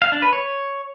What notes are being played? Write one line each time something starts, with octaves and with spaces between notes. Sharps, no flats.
F5
D4
B4
C#5